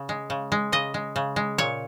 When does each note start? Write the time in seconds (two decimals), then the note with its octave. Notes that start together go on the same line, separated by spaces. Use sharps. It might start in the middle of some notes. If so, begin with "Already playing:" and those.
Already playing: C#3
0.09 G#3
0.30 C#3
0.52 G#3
0.72 C#3 D#5
0.94 G#3
1.16 C#3
1.36 G#3
1.58 A#2 C#5